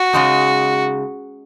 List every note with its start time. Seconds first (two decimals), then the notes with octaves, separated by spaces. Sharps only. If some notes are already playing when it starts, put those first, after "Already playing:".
Already playing: F#4
0.13 C#3 G#3 D#4